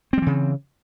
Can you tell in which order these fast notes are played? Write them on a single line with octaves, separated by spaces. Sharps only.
C4 G3 E3 C#3